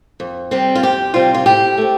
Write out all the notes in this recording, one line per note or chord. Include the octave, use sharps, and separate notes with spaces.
F2
C3 G3 C4
F4
F2 G4
C3 G3 C4 F4
F4
A2 G4
A3 C4